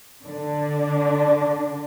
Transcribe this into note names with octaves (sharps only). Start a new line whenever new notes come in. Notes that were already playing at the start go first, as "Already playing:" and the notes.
D3 D4